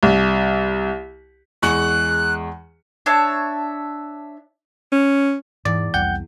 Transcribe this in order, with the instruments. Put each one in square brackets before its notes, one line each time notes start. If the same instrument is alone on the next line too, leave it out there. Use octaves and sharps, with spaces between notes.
[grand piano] C2
[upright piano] E2 G#3 C#6 [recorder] F#6
[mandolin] D4 C#5 E5 A5
[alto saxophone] C#4
[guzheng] E2 [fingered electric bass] G#2 [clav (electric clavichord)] D5
[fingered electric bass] C2 F2 G3 [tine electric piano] F#5 G5 G6